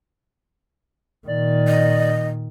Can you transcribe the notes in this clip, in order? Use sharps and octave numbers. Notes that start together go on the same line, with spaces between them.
A#2 D#3 D5
D#5